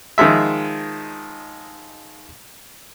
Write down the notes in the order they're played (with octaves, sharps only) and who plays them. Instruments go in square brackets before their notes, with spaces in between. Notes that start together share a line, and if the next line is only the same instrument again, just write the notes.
[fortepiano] D#3 F3 G#3 E5